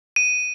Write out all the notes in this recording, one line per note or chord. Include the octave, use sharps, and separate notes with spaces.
D#7